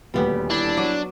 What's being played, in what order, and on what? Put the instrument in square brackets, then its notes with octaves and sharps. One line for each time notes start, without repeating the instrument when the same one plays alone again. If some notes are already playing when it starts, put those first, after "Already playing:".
[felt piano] D#1 D2 A#2 [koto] G3 B3 G4
[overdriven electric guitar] D4 [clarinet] E4
[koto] F#3 [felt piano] D6